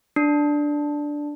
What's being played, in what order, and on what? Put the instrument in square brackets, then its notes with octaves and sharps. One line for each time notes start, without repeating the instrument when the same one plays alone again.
[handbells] D4